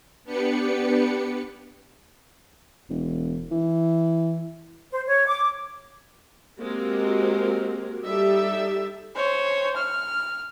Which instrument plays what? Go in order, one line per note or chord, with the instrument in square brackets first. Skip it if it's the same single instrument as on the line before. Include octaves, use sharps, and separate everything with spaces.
[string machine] B3 D4 G4 B4 C#7
[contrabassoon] E1
E3
[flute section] C5
C#5
D6
[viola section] G#3 A#3 C4 F#4 G4 A#4
G3 D#4 G4 A4 E5
[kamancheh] C5 C#5
F6